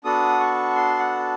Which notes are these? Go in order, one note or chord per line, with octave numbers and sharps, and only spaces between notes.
B3 D4 F#4 A4 D#6
C#6
C6
F#5